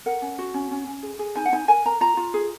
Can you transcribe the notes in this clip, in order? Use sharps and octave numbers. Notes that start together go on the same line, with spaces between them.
A#4 F#5
C#4
F#4
C#4
C#4
C#4
G#4
G#4
D#4 G#5
F#5
D#4 G#5
A#4 G#5
A#4 A#5
F4 A#5
F4
G#4